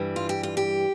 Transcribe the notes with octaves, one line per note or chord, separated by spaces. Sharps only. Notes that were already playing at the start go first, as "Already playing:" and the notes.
Already playing: G2 E3 G3
F4
G4
F4
G4